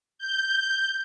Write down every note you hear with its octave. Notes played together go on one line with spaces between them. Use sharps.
G6